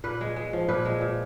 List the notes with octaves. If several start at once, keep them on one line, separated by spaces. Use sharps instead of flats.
A#2 B4
G#3
G#3
F3
A#2 B4
G#3
A#2